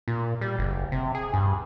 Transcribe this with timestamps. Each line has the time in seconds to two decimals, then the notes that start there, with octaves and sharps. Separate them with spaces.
0.08 A#2
0.41 G3
0.58 F#1
0.92 C3
1.15 G#4
1.34 G2